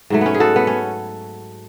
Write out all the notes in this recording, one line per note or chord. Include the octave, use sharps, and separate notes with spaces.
G#2 F#3 A3
B3 C#4
G#4
F#4 A4
B3
C#4